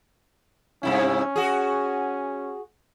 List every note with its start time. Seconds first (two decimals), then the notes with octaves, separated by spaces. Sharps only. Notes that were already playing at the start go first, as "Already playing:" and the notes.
0.83 G2 C3 C#4 E4
1.36 F#4 G#4